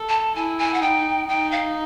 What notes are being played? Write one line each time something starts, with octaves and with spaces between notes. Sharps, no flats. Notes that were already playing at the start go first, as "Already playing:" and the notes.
Already playing: A4
A5
E4 G#5
G#5
F#5
D#4 G5
D#4 G5
F5